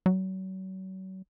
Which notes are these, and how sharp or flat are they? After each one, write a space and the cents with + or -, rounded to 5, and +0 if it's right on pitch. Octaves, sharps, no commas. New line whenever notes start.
F#3 +35